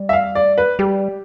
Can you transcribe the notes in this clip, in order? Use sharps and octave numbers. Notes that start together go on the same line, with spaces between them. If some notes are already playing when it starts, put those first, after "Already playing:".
Already playing: G3
E5
F5
D5
B4
G3 G4